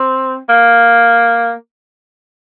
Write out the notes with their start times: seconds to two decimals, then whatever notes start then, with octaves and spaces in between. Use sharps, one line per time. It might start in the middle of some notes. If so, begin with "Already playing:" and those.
Already playing: C4
0.49 A#3